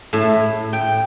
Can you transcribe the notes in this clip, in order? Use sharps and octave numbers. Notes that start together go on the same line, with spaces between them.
A2
G5